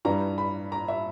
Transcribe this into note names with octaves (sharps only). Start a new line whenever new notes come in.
G2 E3 G3 A#5
B5
A#5
E5